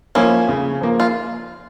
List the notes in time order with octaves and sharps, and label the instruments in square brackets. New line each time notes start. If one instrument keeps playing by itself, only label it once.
[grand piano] F3 A#3 [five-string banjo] C#4 E4
[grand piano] C#3
F3 A#3
[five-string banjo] F4